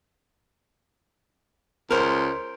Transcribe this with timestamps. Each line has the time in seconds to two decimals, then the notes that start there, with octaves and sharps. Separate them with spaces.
1.91 C#2 A#4 C5